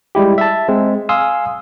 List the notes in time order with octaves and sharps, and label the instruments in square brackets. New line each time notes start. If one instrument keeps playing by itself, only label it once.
[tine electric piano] G3 G#3 E4 G4
E5 A5
G#3 C4
F5 G#5 C6 D#6 E6